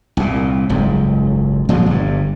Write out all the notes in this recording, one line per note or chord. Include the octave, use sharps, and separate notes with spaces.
C2 A#2
F#1 C#2 G#2
A#2 F3 F#3 G#3
G1 G2